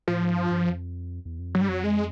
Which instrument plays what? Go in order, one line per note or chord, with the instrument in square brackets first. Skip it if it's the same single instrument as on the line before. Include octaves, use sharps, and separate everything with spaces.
[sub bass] A2 [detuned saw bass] F3
[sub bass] G#2
G2
G2
F2
E2
F2
[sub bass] G2 [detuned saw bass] F#3
[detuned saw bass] G3
[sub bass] F2 [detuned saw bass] F#3
[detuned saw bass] G#3